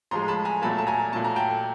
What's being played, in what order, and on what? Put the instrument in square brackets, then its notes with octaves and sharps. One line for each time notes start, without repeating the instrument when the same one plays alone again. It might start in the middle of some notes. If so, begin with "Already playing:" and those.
[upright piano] A2 F3 G#3 A#5 C6
A5 B5
G#5 A#5
A#2 F#3 A3 A5 B5
A5
G#5 A#5
A#2 F#3 A3 A5
A#5
G5 A5